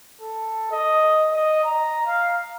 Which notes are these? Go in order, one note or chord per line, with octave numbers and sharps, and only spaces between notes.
A4
D#5
D#5
A#5
F5